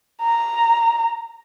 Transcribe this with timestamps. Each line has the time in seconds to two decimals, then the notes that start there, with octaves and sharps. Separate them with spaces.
0.22 A#5